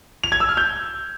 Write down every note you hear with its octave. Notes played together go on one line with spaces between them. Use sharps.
F7
G#6
E6
F6
G6